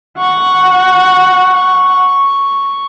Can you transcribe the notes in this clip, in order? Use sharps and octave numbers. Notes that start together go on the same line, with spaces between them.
F#5 C#6